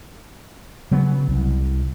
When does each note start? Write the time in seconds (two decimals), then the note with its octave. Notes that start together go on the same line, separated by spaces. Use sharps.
0.91 C#3 F#3 B3
1.28 C2